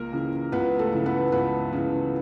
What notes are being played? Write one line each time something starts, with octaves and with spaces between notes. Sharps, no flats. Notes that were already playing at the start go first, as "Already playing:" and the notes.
Already playing: C#2 A#3 A#4
C#3 E3
C#2 B3 B4
A3 A4
C#3 E3
B3 B4
C#2 B3 B4
C#3 E3